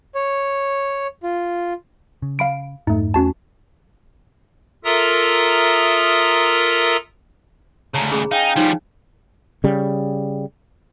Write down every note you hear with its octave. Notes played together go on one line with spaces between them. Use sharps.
C#5
F4
C#3
F5 B5 D7
F2 G#2 A3 D#4
E2 A3 C#4 F#4 A5
F4 A4 A#4 E5 A#5 D#6
D2 C#3 C#5 A5 A#5
C#4 G#4 B5
D#4 F5 G5 G#5
F3 G3 D#4 C#5
C#3 G3